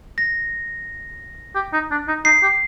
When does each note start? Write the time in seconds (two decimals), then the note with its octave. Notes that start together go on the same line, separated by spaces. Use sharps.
0.18 A#6
1.56 G4
1.73 D#4
1.91 D4
2.08 D#4
2.25 D#4 C7
2.43 G4